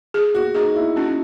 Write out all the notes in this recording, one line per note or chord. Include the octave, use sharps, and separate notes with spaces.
G#4
F#4
D#4 G#4
E4
C#4 F#4